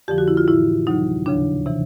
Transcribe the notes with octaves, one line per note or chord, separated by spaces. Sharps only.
F2 D3 F3 G4
F#4
E4
F4
A2 E3 E4
D2 C3 D#3 F#3 D#4
D#2 C#3 F3 D4
C3 E3